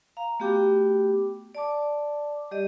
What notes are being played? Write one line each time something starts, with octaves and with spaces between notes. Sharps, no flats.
F5 A#5
A3 B3 F#4 G4 G5 D6
D5 A5 D6
G3 G4 D5 D#5